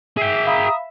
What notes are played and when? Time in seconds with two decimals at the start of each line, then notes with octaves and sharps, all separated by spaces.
0.17 G#4 E5 G5
0.47 F5 A#5 B5 D#6